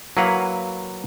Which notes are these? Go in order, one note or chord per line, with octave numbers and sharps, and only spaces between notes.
F#3 A#3 E4 B4 F5 F#5